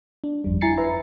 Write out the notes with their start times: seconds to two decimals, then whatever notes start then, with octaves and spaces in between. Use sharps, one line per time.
0.24 D4
0.44 G1 F2 G3
0.61 E4 G#5 A#5 A6 C7 C#7
0.77 B4 E5 A#5